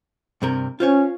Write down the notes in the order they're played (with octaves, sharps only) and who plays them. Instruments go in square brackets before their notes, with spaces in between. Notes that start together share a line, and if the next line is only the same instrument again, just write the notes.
[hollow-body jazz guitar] G2 C3 A#4
[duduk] C#4 [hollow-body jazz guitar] F4 C5 C#5